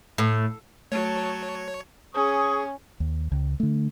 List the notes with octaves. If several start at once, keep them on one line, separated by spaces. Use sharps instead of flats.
A2
F#3 A3 C#5 A5
C#4 G#4 C#6 D#6
D#2
C#2
D3 A3